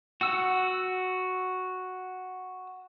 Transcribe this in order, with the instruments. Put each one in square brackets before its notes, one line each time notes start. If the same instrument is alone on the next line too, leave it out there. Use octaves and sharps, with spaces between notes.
[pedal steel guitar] F#4 F#5 E6